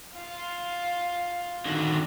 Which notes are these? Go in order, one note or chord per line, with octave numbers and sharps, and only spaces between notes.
F4
D3 D#3 F#4